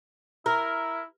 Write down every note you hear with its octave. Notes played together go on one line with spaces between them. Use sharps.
E4 A#4